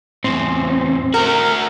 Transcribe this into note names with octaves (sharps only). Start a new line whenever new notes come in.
E2 A2 C4
A3 F#4 A#4